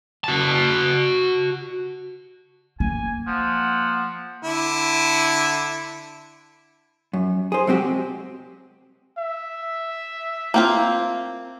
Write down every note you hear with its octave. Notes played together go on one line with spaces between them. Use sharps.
F#4 A5
A#3 G#5
F3 F#5
D3 E4
F#2
G#4 C5
F#3 G#3 C4 F#4 G4
E5
A#3 C4 F4